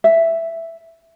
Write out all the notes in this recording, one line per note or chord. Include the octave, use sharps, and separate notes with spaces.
E5